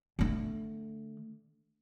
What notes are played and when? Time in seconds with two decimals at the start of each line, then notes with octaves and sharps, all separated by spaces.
0.19 D3 A3